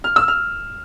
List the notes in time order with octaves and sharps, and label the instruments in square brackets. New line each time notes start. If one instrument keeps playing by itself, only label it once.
[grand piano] F6
E6
F6